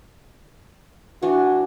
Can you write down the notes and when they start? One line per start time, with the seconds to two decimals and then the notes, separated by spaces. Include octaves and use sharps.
1.23 E3 D4 F#4